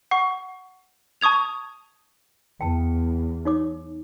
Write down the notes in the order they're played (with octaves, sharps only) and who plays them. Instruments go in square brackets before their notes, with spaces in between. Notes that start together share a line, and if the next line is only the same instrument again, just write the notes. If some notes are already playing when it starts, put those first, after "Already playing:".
[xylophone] F#5 C#6
A5 C#6 D#6 G#6 F7
[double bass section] E2 [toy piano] G5 A5
[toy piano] D#4 C#5 D6